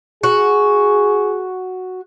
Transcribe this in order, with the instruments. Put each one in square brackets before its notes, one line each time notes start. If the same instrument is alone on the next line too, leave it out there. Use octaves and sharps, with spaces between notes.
[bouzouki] F#4 [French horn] G#4